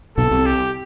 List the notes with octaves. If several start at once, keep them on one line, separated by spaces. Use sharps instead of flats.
B1 B2 A4
C2 C3
G4